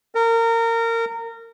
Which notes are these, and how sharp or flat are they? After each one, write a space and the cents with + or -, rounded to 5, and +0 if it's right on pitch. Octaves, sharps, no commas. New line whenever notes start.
A#4 -25